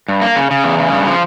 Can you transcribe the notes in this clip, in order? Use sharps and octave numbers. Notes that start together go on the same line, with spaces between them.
G2
A#3
C#3
C#3
E2
C#3
G2
F3